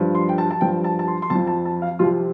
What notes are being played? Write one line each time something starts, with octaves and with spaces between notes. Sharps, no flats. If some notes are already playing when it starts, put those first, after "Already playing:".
Already playing: G2 F3
C6
G5
A5
A5
G2 F3 G5
A5
A5
C6
C6
F2 A5
F3
A5
A5
F5
C2 C3 F3 F4